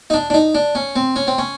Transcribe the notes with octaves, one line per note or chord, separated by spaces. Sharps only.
D#4
D4
D4
D#4
D4
C#4
C4
C#4
C4
C#4